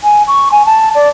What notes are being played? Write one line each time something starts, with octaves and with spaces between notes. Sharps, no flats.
G#5
C#6
G#5
A5
D5